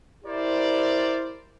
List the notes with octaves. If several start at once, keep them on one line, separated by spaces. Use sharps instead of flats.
E4 G4 A#4 C5 D5